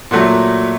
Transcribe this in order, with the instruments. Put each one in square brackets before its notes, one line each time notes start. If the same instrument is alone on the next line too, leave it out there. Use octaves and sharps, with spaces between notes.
[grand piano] A#2 F#3 A3 F#4